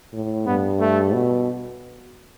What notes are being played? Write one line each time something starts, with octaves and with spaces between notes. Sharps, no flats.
A2
G2 B3
A3
B2